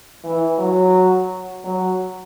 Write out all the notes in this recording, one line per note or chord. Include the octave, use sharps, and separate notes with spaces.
E3
F#3
F#3